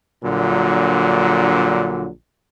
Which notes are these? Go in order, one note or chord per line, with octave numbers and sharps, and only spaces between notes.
A#1 A#2 D3 F#3